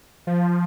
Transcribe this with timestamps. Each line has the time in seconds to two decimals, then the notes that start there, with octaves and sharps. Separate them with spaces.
0.27 F3